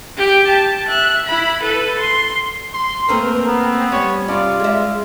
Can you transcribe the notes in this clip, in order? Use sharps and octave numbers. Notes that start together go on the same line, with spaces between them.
G4 G5
A5
E5 F#6
E4 B5
A4 B4
C6
C6
A3 A#3 C4 A#4 B4
B3
G3 C#4 C#5
C3 C#4 F4 D5
G#3 E5